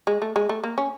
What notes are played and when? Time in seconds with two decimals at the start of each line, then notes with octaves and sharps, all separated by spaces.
0.07 G#3
0.22 A3
0.36 G#3
0.49 A3
0.64 A#3
0.78 C#4